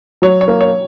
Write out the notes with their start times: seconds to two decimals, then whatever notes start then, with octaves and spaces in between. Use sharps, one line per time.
0.22 F#3 C#5
0.41 C#5
0.48 A#3
0.61 C#5